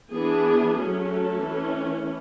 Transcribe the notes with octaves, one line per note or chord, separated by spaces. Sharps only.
E3 B3 D4 G#4
F#3 A3 C#4
A4
E3 A3 C#4